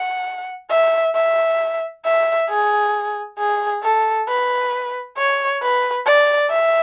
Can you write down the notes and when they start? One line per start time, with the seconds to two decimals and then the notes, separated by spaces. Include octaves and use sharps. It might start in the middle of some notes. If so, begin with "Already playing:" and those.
Already playing: F#5
0.70 E5
1.15 E5
2.05 E5
2.50 G#4
3.39 G#4
3.83 A4
4.28 B4
5.18 C#5
5.62 B4
6.06 D5
6.51 E5